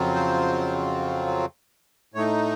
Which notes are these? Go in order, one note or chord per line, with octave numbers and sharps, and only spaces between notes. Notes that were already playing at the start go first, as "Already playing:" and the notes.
Already playing: F2 C#3 F#3 C4 F4
C5
A2 A3 D#4 C#5